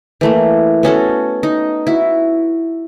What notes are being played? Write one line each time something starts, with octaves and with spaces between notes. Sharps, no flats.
E3 A3 A#3
B3 C#4 F#4 A4
D#4
E4 F#4